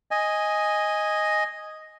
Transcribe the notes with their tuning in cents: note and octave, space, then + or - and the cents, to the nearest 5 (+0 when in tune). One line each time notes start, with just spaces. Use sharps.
D#5 +5 G#5 -5